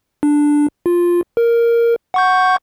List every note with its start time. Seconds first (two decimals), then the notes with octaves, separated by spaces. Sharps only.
0.23 D4
0.86 F4
1.37 A#4
2.14 F#5 C#6 G6